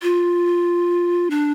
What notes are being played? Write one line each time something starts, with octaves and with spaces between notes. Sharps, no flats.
F4
D4